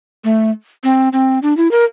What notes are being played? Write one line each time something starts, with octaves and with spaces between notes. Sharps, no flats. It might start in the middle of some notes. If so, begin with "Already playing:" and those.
A3
C4
C4
D4
E4
A#4